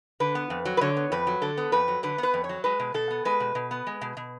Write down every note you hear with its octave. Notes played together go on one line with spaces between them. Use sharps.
D3 B4
B3
F2
F#3
B4
D3 C#5
B3
F2 B4
F#3
D3 A4
B3
F2 B4
F#3
D3 B4
B3 B4
F2
C#5
F#3
G#3 B4
B2
B2 A4
B3
G#3 B4
B2
B2
B3
G#3
B2
B2